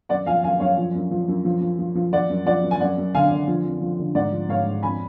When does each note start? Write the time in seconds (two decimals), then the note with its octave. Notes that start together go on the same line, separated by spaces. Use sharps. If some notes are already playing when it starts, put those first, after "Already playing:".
0.09 F#2 D5 F#5
0.26 F3 F5 G#5
0.43 F#2 F5 G#5
0.60 F#2 C#5 F5
0.77 F3
0.95 F#2
1.11 F3
1.28 F#2
1.45 F3
1.61 F3
1.79 F3
1.95 F3
2.12 F3 D5 F#5
2.30 F#2
2.46 F3 D5 F#5
2.64 F#2
2.71 G#5
2.80 F#2 D5 F#5
2.98 F#2
3.14 D3 F5 G#5
3.31 D3
3.48 F3
3.64 F2
3.81 F3
3.99 D3
4.15 G#2 D5 F#5
4.32 F3
4.49 G#2 C#5 F5
4.66 G#2
4.83 F2 G#5 B5